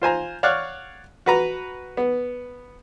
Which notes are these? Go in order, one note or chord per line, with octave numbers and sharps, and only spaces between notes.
F4 C5 G#5 A#5
C#5 D5 F5 F#5 C#6 F#6
F#4 B4 A#5
B3